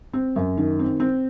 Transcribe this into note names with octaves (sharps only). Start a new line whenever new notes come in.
C4
F#2
D#3
C4
C4